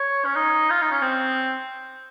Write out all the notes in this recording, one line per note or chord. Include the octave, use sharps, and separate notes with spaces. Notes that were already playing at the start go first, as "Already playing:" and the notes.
Already playing: C#5
C#4
D#4
F4
D#4
C#4
C4